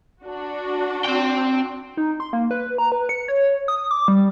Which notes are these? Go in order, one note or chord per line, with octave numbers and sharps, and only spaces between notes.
D4 F#4
C4 G5
D#4
C6
A#3
B4
A#5
B4
C#7
C#5
D#6
D6
G3